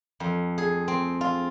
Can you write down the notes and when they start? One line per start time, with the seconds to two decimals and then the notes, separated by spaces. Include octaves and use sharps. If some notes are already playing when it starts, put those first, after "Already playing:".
0.20 F2
0.58 G#4
0.88 C4
1.21 F4